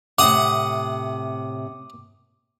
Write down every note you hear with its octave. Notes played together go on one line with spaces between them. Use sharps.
A2 C3 F#5 D6 D#6